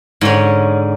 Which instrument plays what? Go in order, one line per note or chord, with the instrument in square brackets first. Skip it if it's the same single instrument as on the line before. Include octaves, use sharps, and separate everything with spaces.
[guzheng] G#2 D3 C#4